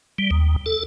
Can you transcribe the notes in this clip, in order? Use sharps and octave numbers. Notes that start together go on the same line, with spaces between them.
G3
D#2
A4